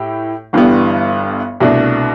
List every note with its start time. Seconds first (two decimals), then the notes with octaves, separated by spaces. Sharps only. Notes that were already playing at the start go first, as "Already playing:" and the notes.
Already playing: A2 E4 G4
0.53 G1 G2 E3 G3 B3
1.60 C2 B2 A3 D4